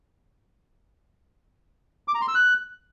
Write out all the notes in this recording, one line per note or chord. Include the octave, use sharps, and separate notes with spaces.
D6
A#5
C6
E6
F#6